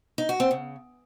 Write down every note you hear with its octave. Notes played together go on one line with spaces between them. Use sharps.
D#4
F#4
C4
C#3